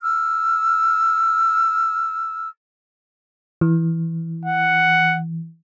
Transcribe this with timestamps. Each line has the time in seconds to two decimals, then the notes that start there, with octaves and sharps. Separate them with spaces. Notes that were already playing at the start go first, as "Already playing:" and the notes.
0.03 E6 F6
3.61 E3
4.45 F#5